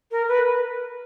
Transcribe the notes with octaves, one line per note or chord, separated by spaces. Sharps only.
A#4
B4